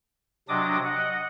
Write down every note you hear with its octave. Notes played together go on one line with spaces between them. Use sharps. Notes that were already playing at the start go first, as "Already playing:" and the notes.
C3 F#3 D4 D#5 D6 D#6
D#5 F#5